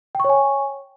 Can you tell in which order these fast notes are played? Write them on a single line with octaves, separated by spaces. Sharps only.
G5 C#6 C#5 G#5